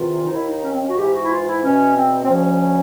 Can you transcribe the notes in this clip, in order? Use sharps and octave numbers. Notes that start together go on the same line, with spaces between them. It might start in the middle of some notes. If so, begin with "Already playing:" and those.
Already playing: E2 C3 D#3 F4
D#4
D#2 D#3 E4
D#4
C#4
C4
C#4
F#4
G#2 E3 G4
F#4
E4
F4
E4
E2 B2 C#4
C4
C4
D2 C#3 F3 C#4